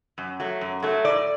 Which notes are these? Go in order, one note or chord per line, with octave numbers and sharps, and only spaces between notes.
F#2
F#3 A3
F#2
F#3 A3
A2 D5